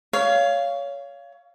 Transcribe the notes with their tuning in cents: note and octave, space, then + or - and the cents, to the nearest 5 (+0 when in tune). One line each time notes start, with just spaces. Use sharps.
C#5 +20 F5 -10